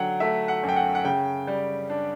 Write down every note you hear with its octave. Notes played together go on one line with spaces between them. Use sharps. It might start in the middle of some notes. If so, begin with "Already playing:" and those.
Already playing: D3 F#3 F#5 G5
A3 E5
F#5
F#2
G5
F#5
F#5
C#3 G5
G3
D4